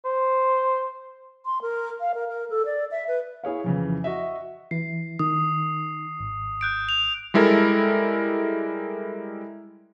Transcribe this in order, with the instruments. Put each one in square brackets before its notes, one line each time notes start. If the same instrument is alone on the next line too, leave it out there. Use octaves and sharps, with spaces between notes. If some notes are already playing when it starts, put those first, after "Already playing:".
[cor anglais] C5
[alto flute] C6
A#4
F5
A#4
A#4
A4
D5
E5
B4
[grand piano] E4 G#4 C#5 F5
F2 C#3 E3
F#4 D#5 E5
[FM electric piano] E3 E4 [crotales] C7
[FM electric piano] D#3 [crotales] D#6
[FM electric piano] G#1
[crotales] F#6 G6 D7
F7
[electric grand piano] G3 G#3 E4 A4 A#4